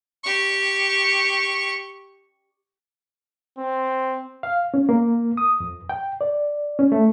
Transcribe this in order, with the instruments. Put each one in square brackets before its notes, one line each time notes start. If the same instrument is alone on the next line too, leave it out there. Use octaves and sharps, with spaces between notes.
[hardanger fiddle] G4 C#6
[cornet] C4
[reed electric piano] F5
C#4
A#3
D#6
F2
G5
D5
C#4
A3